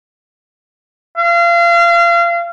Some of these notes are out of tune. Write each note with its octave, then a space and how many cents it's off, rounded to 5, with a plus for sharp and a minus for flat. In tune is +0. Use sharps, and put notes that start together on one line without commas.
F5 -30